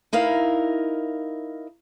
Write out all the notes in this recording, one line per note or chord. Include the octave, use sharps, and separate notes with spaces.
D#4 E4 A#4 F5